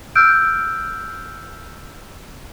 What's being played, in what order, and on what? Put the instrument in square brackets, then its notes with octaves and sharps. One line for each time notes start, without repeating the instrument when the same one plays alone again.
[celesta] E6 F6 G6 D7